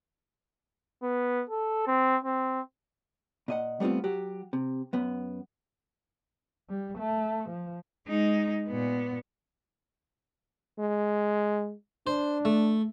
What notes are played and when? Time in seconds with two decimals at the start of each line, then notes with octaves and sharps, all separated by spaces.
1.03 B3
1.50 A4
1.87 C4
2.24 C4
3.48 A#2 D#5 F#5
3.80 G3 A3 B3 C4 F4
4.04 F#3 F#4 G4
4.53 C3
4.93 F#2 B3
6.69 G3
6.98 A3
7.50 F3
8.07 G#3 D#4
8.69 A#2 B3
10.79 G#3
12.07 D4 C5
12.45 A3